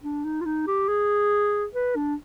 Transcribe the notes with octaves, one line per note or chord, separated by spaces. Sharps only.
D4
D#4
F4
D#4
G4
G#4
B4
D4